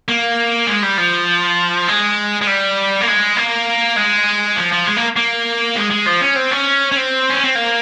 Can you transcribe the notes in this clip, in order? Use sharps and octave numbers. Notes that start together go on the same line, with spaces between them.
A#3
G#3
G3
F3
G#3
G#3
G3
A#3
G#3
A#3
G#3
F3
F3
G#3
A#3
A#3
G#3
G#3
F3
C#4
C4
C#4
C#4
C4
C#4
C4
A#3